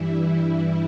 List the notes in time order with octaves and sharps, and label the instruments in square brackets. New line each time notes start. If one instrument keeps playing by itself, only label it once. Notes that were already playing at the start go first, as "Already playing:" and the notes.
Already playing: [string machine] G2 E3 G3 E4
E4